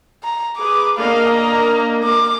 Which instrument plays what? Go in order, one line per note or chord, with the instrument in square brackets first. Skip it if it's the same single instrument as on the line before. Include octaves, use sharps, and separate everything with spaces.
[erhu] A#5
[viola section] G#4 B4 [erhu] D6
[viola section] A#3 D4 D#5 [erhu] F5
[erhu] A#5
[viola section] A#3 [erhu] D6